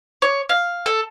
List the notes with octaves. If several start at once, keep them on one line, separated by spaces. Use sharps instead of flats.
C#5
F5
A4